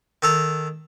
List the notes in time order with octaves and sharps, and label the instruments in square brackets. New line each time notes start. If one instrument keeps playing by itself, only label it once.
[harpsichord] D#3 A4 A#5